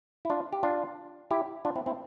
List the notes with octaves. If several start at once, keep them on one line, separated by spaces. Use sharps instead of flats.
E4
D4 F4
G4
D4 F4
E4 G4
D4 F4
C4 E4
C4 E4